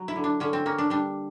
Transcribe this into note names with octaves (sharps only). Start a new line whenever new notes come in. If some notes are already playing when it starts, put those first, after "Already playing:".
Already playing: F#3
E4
D3
D4
D3 C#4
C4
A#3 C#4
D4
G3 D4